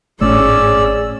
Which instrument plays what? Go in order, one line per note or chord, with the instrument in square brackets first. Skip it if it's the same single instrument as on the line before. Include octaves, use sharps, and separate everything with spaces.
[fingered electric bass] G#1 A2 A3 [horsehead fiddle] C#4 G#4 [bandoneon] D5 E6